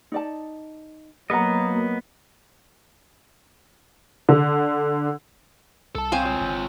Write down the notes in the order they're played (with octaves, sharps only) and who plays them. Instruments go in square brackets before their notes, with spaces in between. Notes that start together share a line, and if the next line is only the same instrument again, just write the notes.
[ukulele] D#4 D5 A5
[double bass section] F#3 A#3 [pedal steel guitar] B3 D#5 [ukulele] A#4 F#5 A#5
[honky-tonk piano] D3
[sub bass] C2 [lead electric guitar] A4 A5
[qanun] C4 C5 G#5 [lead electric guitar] C#5 F5
[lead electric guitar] F4 C#5
[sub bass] G#1